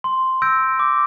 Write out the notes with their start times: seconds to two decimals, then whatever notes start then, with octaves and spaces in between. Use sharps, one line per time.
0.04 C6
0.42 E6 G6 A#6 D7
0.79 D6